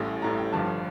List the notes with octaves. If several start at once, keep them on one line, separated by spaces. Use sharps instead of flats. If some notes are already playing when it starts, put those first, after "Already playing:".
Already playing: A1 A2 G3
A1 A2 G3 A#5
G5
G1 G2 F3 A5